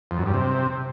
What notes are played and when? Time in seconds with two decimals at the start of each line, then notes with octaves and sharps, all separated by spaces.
0.11 F2
0.19 F#2
0.26 G2
0.34 C3